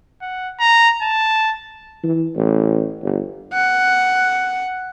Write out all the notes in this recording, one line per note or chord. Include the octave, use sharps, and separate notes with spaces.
F#5
A#5
A5
E3
A1
G1
F#5